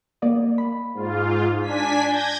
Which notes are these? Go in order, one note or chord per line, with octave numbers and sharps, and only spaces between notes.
A#3 D5 D#5
B5
G#2 F4
D4 G#5 B6
G6 G#6 A#6